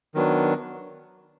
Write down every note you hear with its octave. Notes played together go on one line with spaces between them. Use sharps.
D#3 F#3 B3 D4